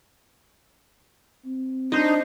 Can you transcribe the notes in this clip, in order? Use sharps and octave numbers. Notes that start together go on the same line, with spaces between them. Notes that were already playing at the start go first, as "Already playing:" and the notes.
C4
D4 D#4 C5 D#5